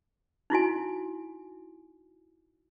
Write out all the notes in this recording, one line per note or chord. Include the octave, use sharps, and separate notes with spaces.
D#4 E4 F#4 G#5